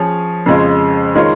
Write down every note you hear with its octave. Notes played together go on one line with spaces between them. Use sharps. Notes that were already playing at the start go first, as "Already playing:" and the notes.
Already playing: F3 C#4 G#4 C#5
F2 C#3 G#3 F4
D#3 G#3 F4 A#4 C#5